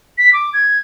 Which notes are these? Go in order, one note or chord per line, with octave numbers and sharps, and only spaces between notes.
B6
D6
G#6